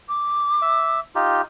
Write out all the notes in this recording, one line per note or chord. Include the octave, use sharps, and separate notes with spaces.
D6
E5
D#4 F4 G4